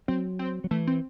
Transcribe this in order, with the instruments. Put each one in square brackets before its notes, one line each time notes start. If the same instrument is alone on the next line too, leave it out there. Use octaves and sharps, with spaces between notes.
[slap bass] F#3 [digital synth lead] C4
[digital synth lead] C4
[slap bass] F#3
[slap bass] E3 [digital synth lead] A3
[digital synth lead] C4